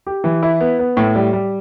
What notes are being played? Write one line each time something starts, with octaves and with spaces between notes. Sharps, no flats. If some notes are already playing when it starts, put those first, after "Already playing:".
G4
E3
E4
B3
B3
A2
G3
G3